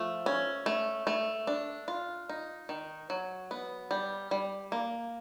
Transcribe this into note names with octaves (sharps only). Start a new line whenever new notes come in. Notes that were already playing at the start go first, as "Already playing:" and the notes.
Already playing: F3 A3
C#4
A3
A3
D4
F4
D#4
D#3
F#3
B3
G3
G3
A#3